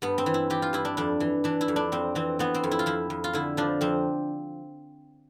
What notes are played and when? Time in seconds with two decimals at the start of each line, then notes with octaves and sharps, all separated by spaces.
0.02 G2 B3
0.18 C4
0.26 E3
0.34 E4
0.50 E3 G4
0.62 F4
0.73 G2 E4
0.85 D4
0.97 F2 D4
1.20 E3
1.44 E3 D4
1.61 E4
1.68 F2
1.76 D4
1.92 F2 C4
2.15 E3 C4
2.39 E3 B3
2.54 C4
2.64 F2
2.71 E4
2.79 F4
2.86 F2 E4
3.10 F2
3.24 F4
3.33 D3 E4
3.57 F3 D4
3.81 F2 C4